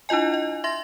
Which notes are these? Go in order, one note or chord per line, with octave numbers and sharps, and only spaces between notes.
D4 E4 F4 D#5 G#5
D#5
E5 C6 A#6